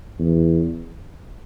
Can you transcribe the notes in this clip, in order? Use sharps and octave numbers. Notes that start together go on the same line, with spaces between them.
E2